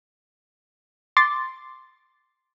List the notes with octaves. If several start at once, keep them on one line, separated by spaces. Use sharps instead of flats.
C6 D6 A6